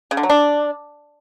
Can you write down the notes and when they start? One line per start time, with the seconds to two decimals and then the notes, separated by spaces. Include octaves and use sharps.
0.11 C#3
0.17 D3
0.23 F#3
0.30 D4